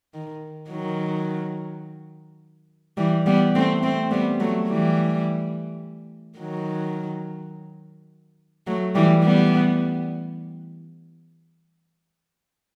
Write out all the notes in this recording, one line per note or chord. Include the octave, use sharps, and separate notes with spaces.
D#3
D#3 F#3
E3 G3
G3 B3
A3 C4
A3 C4
G3 B3
F#3 A3
E3 G3
D#3 F#3
F#3 A3
E3 G3
G3 B3